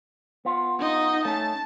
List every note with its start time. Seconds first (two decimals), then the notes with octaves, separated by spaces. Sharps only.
0.45 B3 F4
0.79 D#4 D#5
1.25 A3 C#4 A5